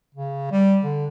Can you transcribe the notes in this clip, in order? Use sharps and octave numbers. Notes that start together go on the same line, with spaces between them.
C#3
G3
D3